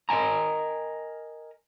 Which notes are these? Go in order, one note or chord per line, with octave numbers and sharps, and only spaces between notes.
A#4 D#5 G5 G#5 A#5